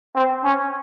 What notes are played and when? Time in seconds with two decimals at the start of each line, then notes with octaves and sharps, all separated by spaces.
0.15 C4
0.44 C#4